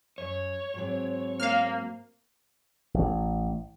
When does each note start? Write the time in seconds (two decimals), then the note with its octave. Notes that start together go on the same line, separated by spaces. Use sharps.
0.18 F#2 C#5
0.74 G#2 F#3 C4
1.40 A#3 F5 F6
2.94 A1